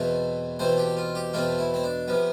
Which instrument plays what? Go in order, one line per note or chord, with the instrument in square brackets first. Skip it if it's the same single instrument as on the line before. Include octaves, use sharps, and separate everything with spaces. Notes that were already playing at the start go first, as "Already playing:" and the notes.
Already playing: [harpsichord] E2 B2 A3 C4
E2 B2 A3 C4 C5
G4
F4
G4
E2 B2 A3 C4 F4
E4
C4
D4
C3 F3 B3